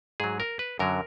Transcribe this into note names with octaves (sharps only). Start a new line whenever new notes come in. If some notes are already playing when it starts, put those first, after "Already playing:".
G#2 F#3 G#4
A#4
B4
F#2 D3 F#3 A#4